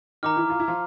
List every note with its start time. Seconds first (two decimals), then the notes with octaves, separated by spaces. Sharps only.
0.23 D#3 D#4 A#5 D6 F6
0.37 E3 E4
0.50 F4
0.60 E4
0.68 F3 F4